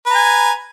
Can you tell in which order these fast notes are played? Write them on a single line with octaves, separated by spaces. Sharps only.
B4 A#5 G#5